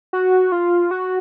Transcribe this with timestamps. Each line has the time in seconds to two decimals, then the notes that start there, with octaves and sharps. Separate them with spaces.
0.13 F#4
0.52 F4
0.91 F#4